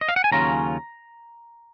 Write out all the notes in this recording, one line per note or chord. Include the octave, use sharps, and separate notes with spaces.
D#5
F5
F#5
G#5
D#2 C#3 F#3 C#4 F4 A#5